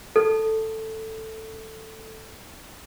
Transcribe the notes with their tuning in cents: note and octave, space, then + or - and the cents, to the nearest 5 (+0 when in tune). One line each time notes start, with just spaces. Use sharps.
A4 +5